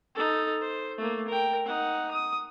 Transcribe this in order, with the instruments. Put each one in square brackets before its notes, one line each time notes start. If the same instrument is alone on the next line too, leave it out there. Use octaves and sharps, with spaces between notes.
[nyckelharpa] D#4 A4
C5
A3 A#3
A#4 G5
D#4 F#5
D#6